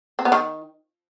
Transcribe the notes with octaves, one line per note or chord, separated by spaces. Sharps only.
C4
B3
D#3